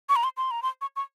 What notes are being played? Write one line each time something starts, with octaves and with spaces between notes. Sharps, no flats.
C#6
A#5
C6
C6
A#5
C6
C#6
C#6